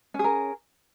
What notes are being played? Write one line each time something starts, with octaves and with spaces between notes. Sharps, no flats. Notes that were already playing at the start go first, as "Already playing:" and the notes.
C#4 G#4 A#4